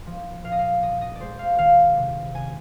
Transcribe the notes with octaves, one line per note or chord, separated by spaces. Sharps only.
F3
A#2 F5
D#5
F5
A#2 D#5
D#5
G#3 C5 D5
F5
D#3 F5
C3
C3 G#5